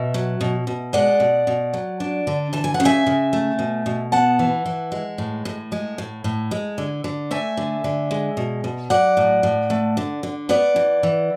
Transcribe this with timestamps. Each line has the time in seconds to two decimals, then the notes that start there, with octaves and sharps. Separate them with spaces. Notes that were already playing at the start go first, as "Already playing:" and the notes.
Already playing: B2 E5
0.14 F#3
0.41 B2
0.67 B2
0.93 G#3 D5 F#5
1.20 B2
1.47 B2
1.74 F#3
2.00 D4
2.27 D3
2.53 E3 A5
2.64 G#5
2.74 F#5
2.80 C#3
2.85 E5 G#5
3.06 C#3
3.33 A3
3.59 B2
3.86 B2
4.12 B3 F#5 A5
4.39 E3
4.66 E3
4.92 G#3
5.18 A2
5.45 A2
5.72 G#3
5.98 A2
6.24 A2
6.51 G#3
6.78 D3
7.04 D3
7.31 A3 E5 G#5
7.57 D3
7.84 D3
8.11 G#3
8.37 B2
8.64 B2
8.90 F#3 D5 F#5
9.17 A2
9.43 A2
9.70 A3
9.97 D3
10.23 D3
10.49 B3 D5 F#5
10.76 E3
11.03 E3